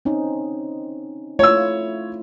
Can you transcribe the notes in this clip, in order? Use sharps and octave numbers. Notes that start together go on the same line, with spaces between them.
C4 C#4 D#4
A3 E4 F4 C#5 E6